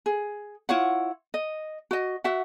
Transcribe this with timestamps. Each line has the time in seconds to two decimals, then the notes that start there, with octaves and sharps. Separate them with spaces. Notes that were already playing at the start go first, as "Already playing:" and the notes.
0.06 G#4
0.69 E4 F4 C#5 F#5
1.34 D#5
1.91 F#4 D#5
2.24 F#4 E5 F#5